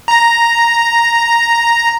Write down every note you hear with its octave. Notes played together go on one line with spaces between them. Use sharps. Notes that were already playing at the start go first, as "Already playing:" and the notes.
A#5 A#6